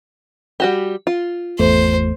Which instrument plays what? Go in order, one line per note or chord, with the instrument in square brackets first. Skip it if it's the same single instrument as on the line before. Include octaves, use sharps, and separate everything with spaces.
[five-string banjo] G3 F#4 G4
F4
[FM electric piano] G#1 E2 A3 [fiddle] C5